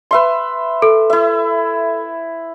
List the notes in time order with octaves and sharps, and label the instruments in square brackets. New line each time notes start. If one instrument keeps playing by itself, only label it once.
[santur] B4 E5 C6
[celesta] A4
[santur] E4 E5